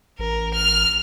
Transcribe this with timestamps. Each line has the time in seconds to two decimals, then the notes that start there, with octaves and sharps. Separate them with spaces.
0.19 A1 A#4
0.55 F6